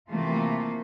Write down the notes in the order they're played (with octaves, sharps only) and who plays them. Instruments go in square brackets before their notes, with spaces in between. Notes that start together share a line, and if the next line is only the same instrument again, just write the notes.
[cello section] C3 E3 F3 A3 A#3 F4